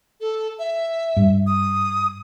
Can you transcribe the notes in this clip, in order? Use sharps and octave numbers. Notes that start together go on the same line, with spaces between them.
A4
E5
G2
D#6